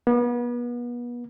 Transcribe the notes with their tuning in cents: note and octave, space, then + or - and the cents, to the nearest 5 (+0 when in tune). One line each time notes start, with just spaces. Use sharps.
B3 -35